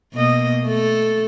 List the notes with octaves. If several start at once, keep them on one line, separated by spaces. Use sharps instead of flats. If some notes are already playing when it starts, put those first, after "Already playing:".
B2 A#3 D#5
A3 A4